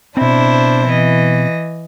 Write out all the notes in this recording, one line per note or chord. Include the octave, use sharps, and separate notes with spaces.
B2 C4 D4 E4 C5
E3 D#5